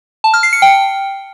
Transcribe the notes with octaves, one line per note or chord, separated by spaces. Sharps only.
A5
F6
C7
C#7
G5